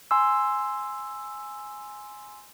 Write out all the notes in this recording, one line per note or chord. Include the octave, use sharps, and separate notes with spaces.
G#5 C6 E6